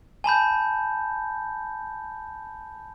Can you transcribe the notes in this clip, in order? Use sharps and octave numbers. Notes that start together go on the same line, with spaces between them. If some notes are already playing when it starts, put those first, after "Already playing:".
G#5 A5 B5 G6